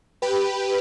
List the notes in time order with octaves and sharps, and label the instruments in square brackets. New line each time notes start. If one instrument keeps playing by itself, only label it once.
[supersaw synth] G4 B4